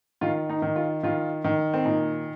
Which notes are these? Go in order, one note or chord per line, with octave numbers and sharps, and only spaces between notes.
D#3 F4
D#4
D#3
F4
D#3 F4
D#3
C4
A#2 D#4